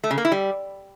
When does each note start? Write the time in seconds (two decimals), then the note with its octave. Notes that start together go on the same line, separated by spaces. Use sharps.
0.04 A3
0.11 C#3
0.18 A#3
0.25 E4
0.32 G3